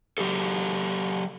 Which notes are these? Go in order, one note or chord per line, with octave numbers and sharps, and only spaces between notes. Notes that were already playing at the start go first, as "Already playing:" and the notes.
F#3 G4 A4